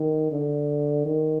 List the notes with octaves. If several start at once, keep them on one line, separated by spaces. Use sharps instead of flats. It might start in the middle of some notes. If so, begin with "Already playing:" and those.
Already playing: D#3
D3
D#3